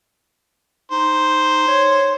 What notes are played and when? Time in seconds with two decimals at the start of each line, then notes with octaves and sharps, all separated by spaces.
0.92 D#4 C5
1.68 C#5